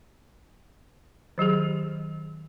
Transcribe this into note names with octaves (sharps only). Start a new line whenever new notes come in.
D#3 F#3 G4 G#4